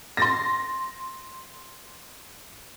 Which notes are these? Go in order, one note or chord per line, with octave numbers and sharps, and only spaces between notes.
C6 A6 A#6